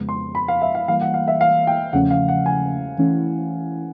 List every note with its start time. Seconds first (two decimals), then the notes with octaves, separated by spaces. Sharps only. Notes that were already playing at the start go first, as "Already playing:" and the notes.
Already playing: F2 C#3 F3 G#3 B3
0.09 C6
0.35 B5
0.48 F5
0.62 E5
0.75 F5
0.88 E3 G3 A#3 F5
1.01 F#5
1.14 F5
1.28 E5
1.41 F5
1.67 G5
1.93 E2 C#3 F3 A3 C#4 F#5
2.11 F5
2.29 F#5
2.46 G#5
2.98 E3 A3 C#4 E4